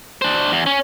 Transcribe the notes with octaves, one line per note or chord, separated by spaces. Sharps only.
D4 C5
E2
C#4